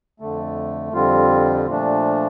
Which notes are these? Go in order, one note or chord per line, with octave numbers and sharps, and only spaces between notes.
F2 D3 A3
F2 D3 G3 C4 F4
A#2 F3 A3 D4